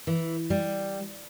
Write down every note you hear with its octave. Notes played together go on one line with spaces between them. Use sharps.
E3
G3